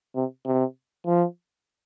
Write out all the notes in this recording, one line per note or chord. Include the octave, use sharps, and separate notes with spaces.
C3
C3
F3